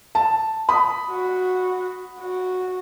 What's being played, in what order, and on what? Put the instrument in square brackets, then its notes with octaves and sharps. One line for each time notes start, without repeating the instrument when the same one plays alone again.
[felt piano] A5
B5 D#6
[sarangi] F#4
F#4